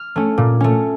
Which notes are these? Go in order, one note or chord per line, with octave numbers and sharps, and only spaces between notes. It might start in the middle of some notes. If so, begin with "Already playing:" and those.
Already playing: F6
A3 C#4
A#2
A3 C#4